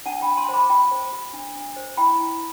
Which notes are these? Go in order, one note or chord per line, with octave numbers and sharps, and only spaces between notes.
D4 F#5 A5
D4 G5 B5
A5 C6
C5
B5 D6
F#4 G5 B5
C5
F#4
D4
D4
C5
E4 G5 B5
E4